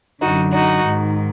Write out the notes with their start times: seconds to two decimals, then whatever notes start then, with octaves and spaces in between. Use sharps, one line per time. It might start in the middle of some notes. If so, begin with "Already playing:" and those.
0.22 F#2 D3 D#4 F#4
0.54 D#4 F#4
0.85 G#2 D#3